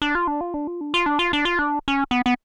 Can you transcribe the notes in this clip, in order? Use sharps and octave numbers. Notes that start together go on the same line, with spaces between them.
D4
F4
D4
F4
D4
F4
D4
F4
D4
F4
D4
F4
D4
C#4
B3
B3